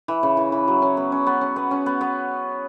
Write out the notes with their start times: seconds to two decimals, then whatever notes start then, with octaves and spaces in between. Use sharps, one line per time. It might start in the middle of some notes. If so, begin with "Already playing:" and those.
0.08 E3
0.23 C#3
0.37 E3
0.52 E3
0.68 F#3
0.82 C#4
0.97 B3
1.12 C#4
1.27 B3
1.41 C#4
1.56 B3
1.71 C#4
1.86 B3
2.01 B3